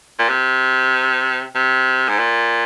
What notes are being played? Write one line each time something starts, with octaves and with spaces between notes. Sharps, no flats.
A#2
C3
C3
G#2
A#2